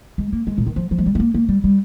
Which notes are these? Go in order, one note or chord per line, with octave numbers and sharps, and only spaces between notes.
G#3
A#3
G#3
A#2
D#3
F3
F3
G#3
G3
G#3
A#3
A#3
G3
G3